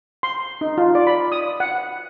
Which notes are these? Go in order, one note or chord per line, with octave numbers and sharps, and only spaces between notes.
C6
D#4
F4
D5
B5
D#6
F#5